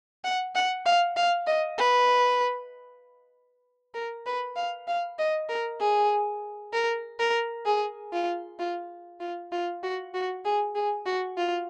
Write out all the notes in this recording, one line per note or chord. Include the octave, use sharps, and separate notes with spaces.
F#5
F#5
F5
F5
D#5
B4
A#4
B4
F5
F5
D#5
A#4
G#4
A#4
A#4
G#4
F4
F4
F4
F4
F#4
F#4
G#4
G#4
F#4
F4